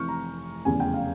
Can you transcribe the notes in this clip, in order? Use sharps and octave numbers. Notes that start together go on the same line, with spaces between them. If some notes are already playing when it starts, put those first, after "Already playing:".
Already playing: F1 F2 E3 C#6 F6 G6
A#5
F1 E2 C#3 G#5
G5
F5